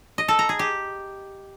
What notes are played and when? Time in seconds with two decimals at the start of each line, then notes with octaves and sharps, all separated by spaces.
0.18 D#5
0.28 A4
0.39 A#5
0.49 G#4
0.59 G4